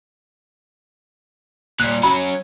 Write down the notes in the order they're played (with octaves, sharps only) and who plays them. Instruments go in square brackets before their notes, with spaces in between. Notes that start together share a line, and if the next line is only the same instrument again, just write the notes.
[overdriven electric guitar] A#2 G3 [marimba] F#6
[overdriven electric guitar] F#3 C#4 [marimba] B5